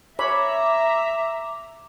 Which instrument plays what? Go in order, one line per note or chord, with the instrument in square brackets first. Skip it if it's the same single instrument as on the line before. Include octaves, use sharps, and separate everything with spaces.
[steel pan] C#5 B5 [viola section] E5 A#5 [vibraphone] D6